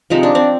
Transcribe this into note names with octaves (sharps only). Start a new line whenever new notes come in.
C3 F3 G#3 D#4
D4
C4